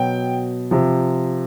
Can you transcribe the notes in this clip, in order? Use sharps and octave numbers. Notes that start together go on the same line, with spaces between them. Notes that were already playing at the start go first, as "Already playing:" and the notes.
Already playing: B2 F#3 G5
C3 F3